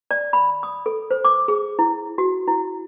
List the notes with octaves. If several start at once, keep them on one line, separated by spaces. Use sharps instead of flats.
D5
B5
D#6
A4
C5
D6
G#4
E4
F#4
E4